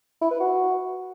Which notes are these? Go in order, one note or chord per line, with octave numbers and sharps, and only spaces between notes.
E4
B4
F#4